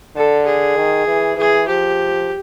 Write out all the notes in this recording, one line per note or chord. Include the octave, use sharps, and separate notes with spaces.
D3 A4
G#4
D#3
E3
E3 G#4
F3 G4